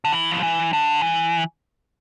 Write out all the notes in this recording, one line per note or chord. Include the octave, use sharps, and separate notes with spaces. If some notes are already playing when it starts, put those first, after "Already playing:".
D3
E3
F3
E3
D3
E3